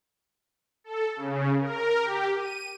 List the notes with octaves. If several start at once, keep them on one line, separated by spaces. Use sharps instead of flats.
A4
C#3
A#4
G4
D#7